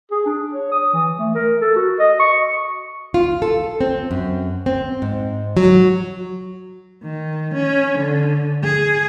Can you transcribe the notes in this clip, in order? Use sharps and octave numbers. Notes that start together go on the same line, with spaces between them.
G#4
D4
C#5
D#6
E3
A3
A#4
A4
F#4
D#5
C#6
F4
A4
C4
F#2
C4
G#2
F#3
D#3
C#4
D3
G#4